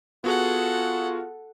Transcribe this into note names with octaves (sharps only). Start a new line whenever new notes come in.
B3 F4 F#4 G#4 A4 F#5